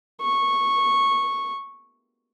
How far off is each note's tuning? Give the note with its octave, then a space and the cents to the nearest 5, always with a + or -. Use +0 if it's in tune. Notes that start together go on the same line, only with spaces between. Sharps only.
C#6 -10